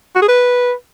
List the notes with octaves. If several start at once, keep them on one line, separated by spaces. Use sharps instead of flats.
F#4
G#4
B4